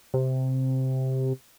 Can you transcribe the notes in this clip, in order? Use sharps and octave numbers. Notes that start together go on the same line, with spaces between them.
C3